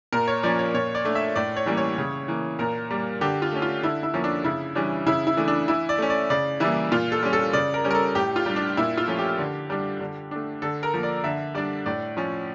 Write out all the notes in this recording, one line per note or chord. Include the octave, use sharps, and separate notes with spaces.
A#2 A#4
C#5
F3 A#3 C#4 D5
C#5
A#2 C#5
D5
A3 D4
E5
A2 D5
C#5
E3 G3 A#3 C#4
C#5
C#3
E3 A#3
A#2 A#4
G3 A#3
D3 G4
F4
A3 C#4
F4
D3 E4
E4
F3 A#3 C#4
D4
C#3 E4
E3 G3 C#4 D4
C#3 E4
E4
E3 A3 D4
D4
E3 E4
D5
A3 C#4
D5
C#3 D5
E3 G3 A#3 E4
A#2 F4
A4
G3 C#4
A4
C#3 D5
A#4
G3 C#4
A#4
A4
A2 G4
F4
G3 D4
D4
A#2 E4
F4
F3 A3 C#4
G4
D3
G3 D4
D3
A3 D4
D3 A4
A#4
F3 A#3
D5
D3 E5
G3 D4 D5
A2 D5
F3 C#4